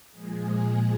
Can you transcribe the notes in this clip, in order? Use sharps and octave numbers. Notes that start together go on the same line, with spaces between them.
A#2 F3 G#3 G#4